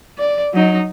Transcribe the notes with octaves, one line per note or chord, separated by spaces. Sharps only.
D5
F#3 D#4